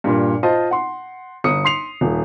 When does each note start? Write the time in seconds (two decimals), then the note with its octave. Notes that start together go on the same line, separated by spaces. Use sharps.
0.04 G2 A#2
0.43 F4 C5 D#5 A5
0.71 F#5 C6
1.44 G1 D#6 C#7
1.65 C6 C7 F7
2.01 D#1